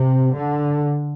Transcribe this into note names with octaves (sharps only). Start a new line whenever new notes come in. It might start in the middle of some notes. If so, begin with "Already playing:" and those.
Already playing: C3
D3